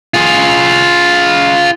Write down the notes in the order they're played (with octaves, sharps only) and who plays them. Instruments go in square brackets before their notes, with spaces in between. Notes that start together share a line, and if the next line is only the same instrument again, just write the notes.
[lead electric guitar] F4 G#4